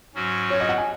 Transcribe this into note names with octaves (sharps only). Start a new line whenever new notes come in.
G#2 F#3 C#4 F#4
C#5
D#5
F#5
G#5